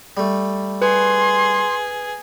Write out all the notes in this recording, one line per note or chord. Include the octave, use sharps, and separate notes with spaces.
G3 A3
G#4 B4 C6